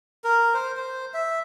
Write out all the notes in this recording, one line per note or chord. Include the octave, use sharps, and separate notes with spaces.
A#4
C5
C5
E5